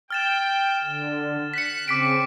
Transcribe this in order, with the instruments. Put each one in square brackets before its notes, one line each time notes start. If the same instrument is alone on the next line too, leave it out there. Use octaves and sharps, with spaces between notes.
[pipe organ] G5 [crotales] F6 A6 E7
[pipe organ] D3
[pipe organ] F#6 [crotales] B6 C#7
[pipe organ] C#3 C4 [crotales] D6 B6 D7